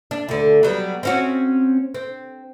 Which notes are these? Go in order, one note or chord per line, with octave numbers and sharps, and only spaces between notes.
D4
D2 D3
F#3 G3 B3
C4 C#4 F#4
C4